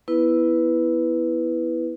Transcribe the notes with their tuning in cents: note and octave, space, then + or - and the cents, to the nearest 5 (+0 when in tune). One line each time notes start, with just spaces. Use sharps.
B3 +0 E4 +0 B4 +0